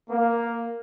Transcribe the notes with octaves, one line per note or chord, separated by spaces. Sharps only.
A#3